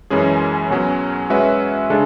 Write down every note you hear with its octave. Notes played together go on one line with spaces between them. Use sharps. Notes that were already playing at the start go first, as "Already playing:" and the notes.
F#2 E3 G#3 C#4 G#4
B2 F#3 C#4
G#3 C#4 F#4 B4 E5
C#3 G#3 D4 A4